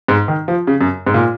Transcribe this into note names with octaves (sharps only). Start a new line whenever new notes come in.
G#2
D#3
F3
C#3
F#2
G#2
A#2